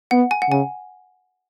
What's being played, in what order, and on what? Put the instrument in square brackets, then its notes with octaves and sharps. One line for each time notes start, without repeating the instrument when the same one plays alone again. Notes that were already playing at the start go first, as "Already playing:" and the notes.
[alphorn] B3 [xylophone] F#5
[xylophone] G#5
F#5
[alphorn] C#3 [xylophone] G#5